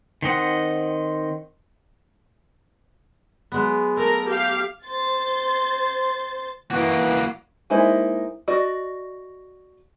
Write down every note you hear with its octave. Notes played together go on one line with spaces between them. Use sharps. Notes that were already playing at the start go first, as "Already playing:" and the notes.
D#3 C4 D#5 F#5
F#3 G#3 B3
A3 A#4
G4 F5
C5 C6 A6
E3 A#3 F#4
G#3 A#3 D#4 E4 C5
F#4 D5 D#5